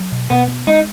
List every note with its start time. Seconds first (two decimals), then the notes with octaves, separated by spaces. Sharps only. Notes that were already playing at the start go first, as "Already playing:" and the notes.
Already playing: F#3
0.12 B2
0.30 B2 B3
0.48 B3
0.67 G#3 D#4